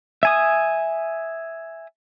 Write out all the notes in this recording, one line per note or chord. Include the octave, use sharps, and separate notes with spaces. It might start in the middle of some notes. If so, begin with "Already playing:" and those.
E5 G#5 D#6